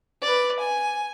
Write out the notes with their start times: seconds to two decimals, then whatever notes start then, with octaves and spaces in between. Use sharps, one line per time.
0.22 B4 D5
0.59 G#5